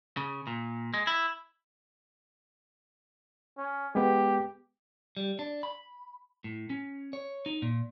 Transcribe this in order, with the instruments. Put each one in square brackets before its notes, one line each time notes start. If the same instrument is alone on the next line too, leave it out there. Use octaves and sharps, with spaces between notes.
[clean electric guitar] C#3
A#2
G#3
E4
[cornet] C#4
[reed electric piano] G#3 B3 [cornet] G4
[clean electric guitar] G3
D4
B5
A2
C#4
C#5
D#4
A#2